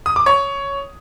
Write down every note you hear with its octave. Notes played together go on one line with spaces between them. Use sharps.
D#6
D6
C#5